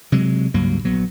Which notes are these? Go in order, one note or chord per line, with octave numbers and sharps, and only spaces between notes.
C3 F#3 G#3
C#2 G2 F#3 A#3
A#1 F#3 B3